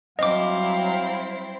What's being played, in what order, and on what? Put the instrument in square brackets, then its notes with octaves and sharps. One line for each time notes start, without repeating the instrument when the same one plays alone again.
[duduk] F#3 [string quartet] G3 C4 E4 [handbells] D#5 D6 [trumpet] F5